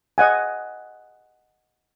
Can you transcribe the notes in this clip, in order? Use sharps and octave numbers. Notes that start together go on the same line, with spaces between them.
D#5 F#5 G#5